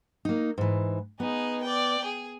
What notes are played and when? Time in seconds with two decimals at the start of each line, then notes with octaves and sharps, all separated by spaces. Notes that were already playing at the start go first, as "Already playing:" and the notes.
0.25 A#3 D#4
0.58 G#2 E3
1.20 B3 D#4 G#4
1.63 D5 G5
2.05 G#4